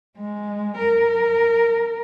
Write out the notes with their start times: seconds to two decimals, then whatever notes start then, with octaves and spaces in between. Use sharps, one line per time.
0.18 G#3
0.78 A#4